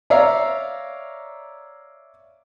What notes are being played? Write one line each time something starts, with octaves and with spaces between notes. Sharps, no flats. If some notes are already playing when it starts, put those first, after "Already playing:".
C#5 D5 E5 F5 A#5